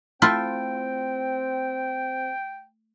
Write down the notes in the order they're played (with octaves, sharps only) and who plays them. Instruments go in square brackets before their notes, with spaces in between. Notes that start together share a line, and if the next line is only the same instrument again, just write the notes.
[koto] A3 E4 F4 [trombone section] C4 [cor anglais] G5